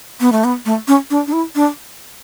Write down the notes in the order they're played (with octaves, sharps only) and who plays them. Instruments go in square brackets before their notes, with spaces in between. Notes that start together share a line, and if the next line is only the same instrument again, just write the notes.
[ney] B3
A3
B3
A3
C#4
D4
D4
E4
D4